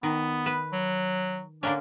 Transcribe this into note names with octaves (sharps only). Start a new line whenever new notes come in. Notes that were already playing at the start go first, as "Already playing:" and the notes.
D#3 B3
B4
F#3
D3 A#3 C#4 D4